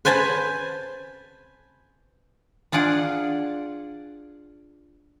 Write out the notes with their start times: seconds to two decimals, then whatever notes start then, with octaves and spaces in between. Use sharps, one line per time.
0.05 B4 C5 G#5 A5 B5
2.72 D4 F4 G#4 D5 F#5